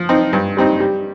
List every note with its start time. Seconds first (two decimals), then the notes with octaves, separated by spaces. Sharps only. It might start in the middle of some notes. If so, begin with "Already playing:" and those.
Already playing: F3
0.09 C4 D#4
0.33 G2
0.57 G3 C4 D#4
0.80 G3